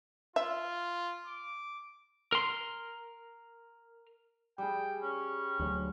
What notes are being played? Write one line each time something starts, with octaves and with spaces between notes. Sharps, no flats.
F4 E5
D6
A#4 C6
G3 G#4 G5
C#4
D2 F#3